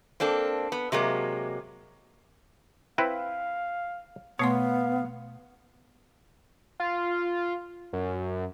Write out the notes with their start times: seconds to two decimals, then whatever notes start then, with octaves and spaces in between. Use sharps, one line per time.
0.20 A#3 C4 D4 A4
0.72 B3
0.92 C3 F#3 G#3 A#3
2.98 C4 E4 B4 F5
4.39 B2 A3 B3 C#5 F5 C6
6.80 F4
7.93 F#2